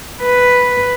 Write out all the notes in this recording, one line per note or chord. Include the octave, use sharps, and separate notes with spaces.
B4